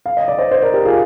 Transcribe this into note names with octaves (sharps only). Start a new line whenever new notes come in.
F5
D#5
D5
C5 D#5
C5 D#5
A#4 D5
G4 A#4
F4 G#4